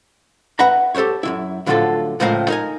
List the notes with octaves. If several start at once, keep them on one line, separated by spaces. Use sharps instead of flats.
B4 E5 F#5 A#5 B5
G4 A4 A#4 C5 C#5
F#2 D#3 E4
A2 D3 F3 F#3 F4 A4
C#2 A2 F3 C4 A#4 F5
D#4 A#4 G#5